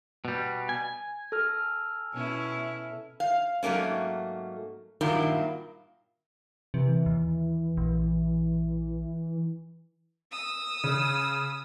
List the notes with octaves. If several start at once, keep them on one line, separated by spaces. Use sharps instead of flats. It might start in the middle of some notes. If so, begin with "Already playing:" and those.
B2 G3
G#5
A4 F6
B2 C#4 E4
F5
G#2 F#3 A3 A#3 C#4
G2 A#2 D#3 F#3 A#3 E4
C3 E3
D#2
A#1
D#6 E6
C#3